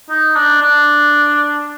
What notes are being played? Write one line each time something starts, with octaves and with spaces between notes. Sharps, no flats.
D#4
D4
D4